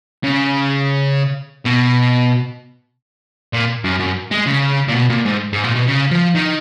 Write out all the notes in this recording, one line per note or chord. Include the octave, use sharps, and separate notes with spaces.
C#3
B2
A#2
F#2
F#2
G#3
C#3
A#2
B2
A#2
G#2
G#2
A#2
B2
C#3
F3
D#3